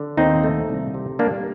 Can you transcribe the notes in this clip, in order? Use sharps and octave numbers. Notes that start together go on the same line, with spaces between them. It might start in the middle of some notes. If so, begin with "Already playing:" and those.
Already playing: D3
D#2 C4 D#4
A3
C2
C3
G3 A#3 D4